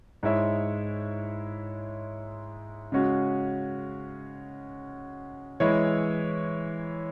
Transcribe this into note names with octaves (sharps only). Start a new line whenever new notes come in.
G#2 G#3 E4 C#5 E5
C#3 G#3 C#4 F#4
E3 G#3 E4 C#5